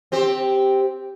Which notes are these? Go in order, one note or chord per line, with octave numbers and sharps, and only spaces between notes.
C4 G4 C5